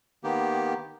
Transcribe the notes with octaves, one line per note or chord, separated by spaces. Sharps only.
D#3 A#3 B3 G4